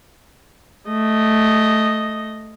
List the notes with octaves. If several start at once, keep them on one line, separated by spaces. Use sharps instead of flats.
A3 D#5